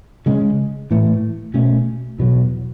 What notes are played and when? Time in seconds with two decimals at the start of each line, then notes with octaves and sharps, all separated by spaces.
0.26 C#3 G#3 C#4
0.90 A2 E3 A3
1.54 B2 A3 C#4
2.18 E2 B2 F#3